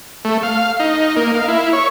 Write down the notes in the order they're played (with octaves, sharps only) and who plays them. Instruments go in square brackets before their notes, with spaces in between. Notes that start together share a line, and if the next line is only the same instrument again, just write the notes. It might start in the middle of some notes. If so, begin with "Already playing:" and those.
[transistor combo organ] A3
F5
D#4
A#3
F5
E4
C#5